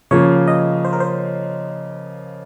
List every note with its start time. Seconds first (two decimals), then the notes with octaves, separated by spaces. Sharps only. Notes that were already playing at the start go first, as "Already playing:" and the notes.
0.11 C#3 F3 A#3 C#5
0.48 D#5
0.85 C5
0.93 A#4
1.00 C5